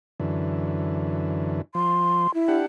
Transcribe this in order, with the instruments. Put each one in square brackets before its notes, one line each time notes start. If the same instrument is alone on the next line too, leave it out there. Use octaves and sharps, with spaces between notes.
[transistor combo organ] F#2 D3 E3
[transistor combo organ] F3 [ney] C6
[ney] E4
[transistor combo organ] D4 G4 F#5